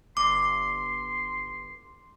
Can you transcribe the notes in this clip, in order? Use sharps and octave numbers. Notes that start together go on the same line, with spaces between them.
G1 C6 D6